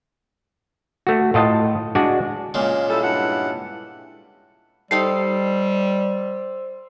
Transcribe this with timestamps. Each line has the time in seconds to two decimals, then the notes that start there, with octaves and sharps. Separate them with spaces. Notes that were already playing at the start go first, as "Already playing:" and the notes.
1.07 A3 F#4
1.34 A2 F4 D#5 A5
1.95 G#3 D4 F#4 D5 G#5
2.54 A#2 C#3 G#3
2.89 G3 E4 A4
3.03 G2 E4 F#5
4.91 G3 D#4 G4 A4 C5 C6 E6 C7